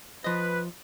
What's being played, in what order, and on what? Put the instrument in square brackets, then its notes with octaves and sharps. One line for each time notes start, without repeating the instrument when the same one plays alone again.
[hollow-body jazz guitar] F3 D#5 [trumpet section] B4